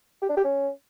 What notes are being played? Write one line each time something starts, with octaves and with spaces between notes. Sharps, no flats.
G4
D4
G4
C#4